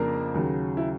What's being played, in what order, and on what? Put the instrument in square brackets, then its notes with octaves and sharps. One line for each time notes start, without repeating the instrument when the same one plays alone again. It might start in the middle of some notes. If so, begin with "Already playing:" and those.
Already playing: [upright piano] F2 C#3 F3 A#3 D4 A#4
D#2 C#3 F#3
E4